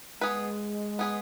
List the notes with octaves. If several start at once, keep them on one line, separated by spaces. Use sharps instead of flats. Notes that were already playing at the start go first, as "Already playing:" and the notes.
G#3 B3 G#4 B4
B3 G#4 B4